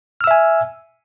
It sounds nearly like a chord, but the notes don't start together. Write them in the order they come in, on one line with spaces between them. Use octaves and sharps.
F6 E6 E5 G#5